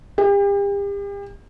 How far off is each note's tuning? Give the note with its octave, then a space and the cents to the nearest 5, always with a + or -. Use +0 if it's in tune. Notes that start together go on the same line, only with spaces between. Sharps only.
G4 +40